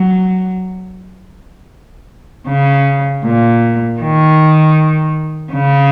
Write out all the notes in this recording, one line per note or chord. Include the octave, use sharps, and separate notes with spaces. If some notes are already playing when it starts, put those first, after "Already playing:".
Already playing: F#3
C#3
A#2
D#3
C#3